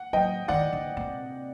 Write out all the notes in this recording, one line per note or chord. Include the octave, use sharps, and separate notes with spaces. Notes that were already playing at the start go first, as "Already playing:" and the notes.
Already playing: F#5
F#3 D#5 G5
D#3 D5 F#5
D3
C3